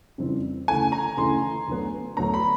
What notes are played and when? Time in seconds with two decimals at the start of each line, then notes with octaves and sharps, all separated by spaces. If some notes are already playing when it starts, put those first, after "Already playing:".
0.18 F2 C#3 E3 G3 C4
0.68 D2 C#3 E3 A3 G#5
0.92 A#5
1.17 D2 C#3 E3 A3 C6
1.67 D2 D3 F#3 B3
2.17 D2 D3 F#3 B3 A#5
2.34 B5